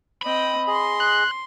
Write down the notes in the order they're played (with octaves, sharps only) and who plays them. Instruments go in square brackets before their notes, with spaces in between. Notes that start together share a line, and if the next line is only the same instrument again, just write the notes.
[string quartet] C4 D#5 G5 [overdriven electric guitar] B5
[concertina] G#4 D#5 [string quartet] C6
[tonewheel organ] F#6